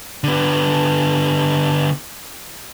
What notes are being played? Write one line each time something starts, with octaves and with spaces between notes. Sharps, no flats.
D3 B3